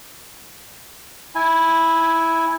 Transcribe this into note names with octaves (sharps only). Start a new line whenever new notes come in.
E4 G#5